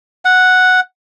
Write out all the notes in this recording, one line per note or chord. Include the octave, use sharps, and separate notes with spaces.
F#5